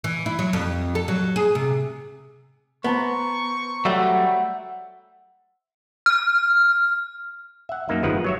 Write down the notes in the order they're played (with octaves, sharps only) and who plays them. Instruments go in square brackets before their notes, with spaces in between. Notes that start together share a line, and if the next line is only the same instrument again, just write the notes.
[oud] E3
E4
F#3
F2
A4
F#3
G#4
C3
[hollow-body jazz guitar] B3 [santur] C5 A5 A#5 [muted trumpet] C#6
[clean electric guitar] F#3 G3 A3 [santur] E5 F#5
[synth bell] F6
[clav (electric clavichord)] E5 F#5
F#2 A#3 D#4 E5
G1 D#3 F3 G#3 B4 F#5
F#3 C#5 E5